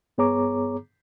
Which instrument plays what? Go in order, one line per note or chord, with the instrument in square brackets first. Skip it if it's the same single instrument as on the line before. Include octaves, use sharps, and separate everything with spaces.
[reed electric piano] G2 B3 G#4 C#5 A#5 D6